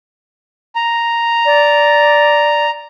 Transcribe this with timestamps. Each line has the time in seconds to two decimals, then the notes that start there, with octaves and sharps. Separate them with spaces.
0.75 A#5
1.45 D5